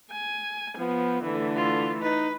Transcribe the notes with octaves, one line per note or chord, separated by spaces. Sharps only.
G#5
F3 B3
D3 E3 A3
F4
D#4 B4